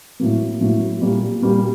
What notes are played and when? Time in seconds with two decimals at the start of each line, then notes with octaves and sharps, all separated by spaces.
0.20 A2 F#3 A#3
0.61 A2 F#3 A#3
1.01 A#2 G3 A#3
1.42 A#2 G3 A#3